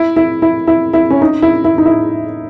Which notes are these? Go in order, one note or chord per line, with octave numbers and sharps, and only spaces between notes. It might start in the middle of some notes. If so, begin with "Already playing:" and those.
Already playing: E4
E4
E4
E4
E4
C#4
D#4
E4
E4
D#4
E4